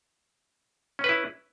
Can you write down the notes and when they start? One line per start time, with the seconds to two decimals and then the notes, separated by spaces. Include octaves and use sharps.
0.99 C#4
1.04 B4
1.09 E4